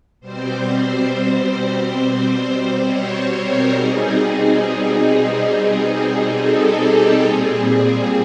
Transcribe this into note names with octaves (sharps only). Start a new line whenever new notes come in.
B2 G3 C4 C5
C#5
C#5
A#4
B2 G3 C4 D#4 G#4
G#4
G#4
A4
G4
G4
A#2 G3 C4 G#4